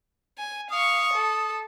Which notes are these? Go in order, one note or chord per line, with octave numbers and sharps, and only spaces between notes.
G#5
F5 C#6 D#6
A4